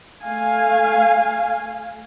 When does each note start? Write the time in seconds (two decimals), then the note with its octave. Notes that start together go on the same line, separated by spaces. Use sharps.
0.22 A3 F5 G#5